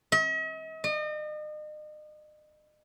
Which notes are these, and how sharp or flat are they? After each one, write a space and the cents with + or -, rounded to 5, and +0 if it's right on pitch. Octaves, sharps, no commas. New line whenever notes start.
D#5 +45
D#5 -40